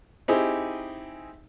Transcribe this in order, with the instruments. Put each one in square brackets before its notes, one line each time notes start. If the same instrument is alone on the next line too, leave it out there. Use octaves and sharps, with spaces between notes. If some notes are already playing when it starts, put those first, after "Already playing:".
[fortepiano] C4 D#4 E4 G4 G#4